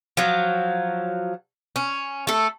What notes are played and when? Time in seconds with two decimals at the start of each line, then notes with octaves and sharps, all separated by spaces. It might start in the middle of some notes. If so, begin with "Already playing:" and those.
0.17 F3 F#3
1.76 C#4
2.27 A3 A4